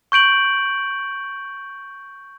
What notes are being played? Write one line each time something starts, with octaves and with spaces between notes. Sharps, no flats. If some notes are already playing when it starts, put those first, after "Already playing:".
C#6 G6 D7 F#7